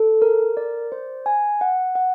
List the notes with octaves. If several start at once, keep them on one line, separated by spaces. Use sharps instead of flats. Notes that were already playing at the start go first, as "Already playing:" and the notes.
Already playing: A4
A#4
D5
C5
G#5
F#5
F#5